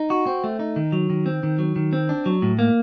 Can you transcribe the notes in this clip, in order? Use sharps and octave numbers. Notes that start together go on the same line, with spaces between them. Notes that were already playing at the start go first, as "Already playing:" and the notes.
Already playing: D#4
F#4
C4
A3
D#4
D#3
F#3
D#3
C4
D#3
F#3
D#3
C4
D4
F#3
A2
A#3